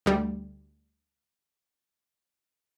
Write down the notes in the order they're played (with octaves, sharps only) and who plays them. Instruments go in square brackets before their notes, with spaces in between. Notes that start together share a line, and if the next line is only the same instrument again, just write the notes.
[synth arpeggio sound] D2 G3